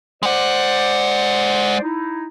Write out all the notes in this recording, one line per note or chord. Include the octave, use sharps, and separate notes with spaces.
G#3 C5 D5 F#5
D#4 E4